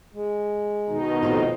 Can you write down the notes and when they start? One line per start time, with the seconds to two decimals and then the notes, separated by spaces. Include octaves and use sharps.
0.13 G#3
0.88 B2 D#3 D#4
1.23 F2 A2 C4 F4 C5